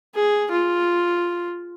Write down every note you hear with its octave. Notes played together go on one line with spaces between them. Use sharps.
G#4
F4